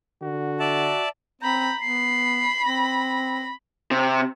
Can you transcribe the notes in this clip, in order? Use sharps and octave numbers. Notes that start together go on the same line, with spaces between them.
D3 F#4
D5 E5 A5
C4 A#5 B5 G6
B3 B5 C7
C4 A#6
C3